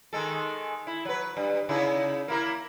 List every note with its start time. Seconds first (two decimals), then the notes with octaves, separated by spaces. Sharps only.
0.13 D#3 G#3 A4
0.87 E4
1.05 F#3 B4
1.37 G2
1.69 C#3 D#4 E4
2.28 A#3 E4 A#4